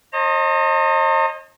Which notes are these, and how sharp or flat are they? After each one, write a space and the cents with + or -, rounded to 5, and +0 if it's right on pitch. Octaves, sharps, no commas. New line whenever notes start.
C5 +45 D#5 +0 A#5 -45